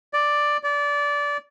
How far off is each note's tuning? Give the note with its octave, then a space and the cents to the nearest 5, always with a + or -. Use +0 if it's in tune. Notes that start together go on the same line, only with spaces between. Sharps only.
D5 +5
D5 -20